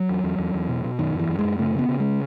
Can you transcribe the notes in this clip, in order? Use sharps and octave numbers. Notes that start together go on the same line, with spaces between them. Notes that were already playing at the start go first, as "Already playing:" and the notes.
Already playing: F#3
E2
E2
E2
E2
B2
B2
F#2 D#3
F#2
E3
F#2
G#3
F#2
C#3 A3
C#3 B3
C#3
G#3